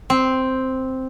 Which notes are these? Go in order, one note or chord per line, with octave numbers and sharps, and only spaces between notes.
C4